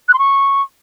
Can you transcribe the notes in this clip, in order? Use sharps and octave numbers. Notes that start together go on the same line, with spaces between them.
F#6
C6
C#6